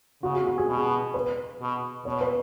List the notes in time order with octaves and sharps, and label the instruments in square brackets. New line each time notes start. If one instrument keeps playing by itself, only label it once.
[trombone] C#3 [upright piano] F#4
[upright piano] G#4
F#4
G#4
[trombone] B2
[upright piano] B4
[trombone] B2
[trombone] B2 [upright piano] C#5
[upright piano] B4